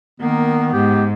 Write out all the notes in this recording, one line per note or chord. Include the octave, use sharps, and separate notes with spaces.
D#3 A#3 B3
G#2 G4